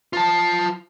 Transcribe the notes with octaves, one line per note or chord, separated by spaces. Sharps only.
F4 A5